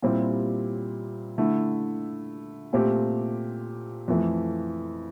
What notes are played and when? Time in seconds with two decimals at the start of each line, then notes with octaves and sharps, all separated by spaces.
0.02 A#2 G3 C4 E4 G4
1.38 D3 A3 E4
2.73 A#2 A3 C4 G4
4.08 F2 E3 A3